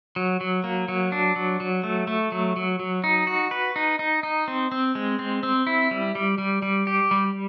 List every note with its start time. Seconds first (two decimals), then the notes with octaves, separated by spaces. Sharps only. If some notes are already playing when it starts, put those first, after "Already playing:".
0.16 F#3
0.41 F#3
0.64 A#3
0.88 F#3
1.12 D4
1.36 F#3
1.60 F#3
1.84 A3
2.07 A3
2.32 F#3
2.56 F#3
2.80 F#3
3.04 D#4
3.27 F#4
3.51 B4
3.76 D#4
3.99 D#4
4.23 D#4
4.48 C4
4.72 C4
4.95 G#3
5.19 C4
5.43 C4
5.67 E4
5.91 G3
6.15 G3
6.38 G3
6.62 G3
6.87 G4
7.11 G3